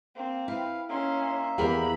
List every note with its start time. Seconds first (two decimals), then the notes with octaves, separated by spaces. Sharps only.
0.16 A#3 C4
0.48 E4 B4 F5
0.89 A#3 C#4 D#4 E5 C6
1.58 E2 G4 G#4 A#4 B5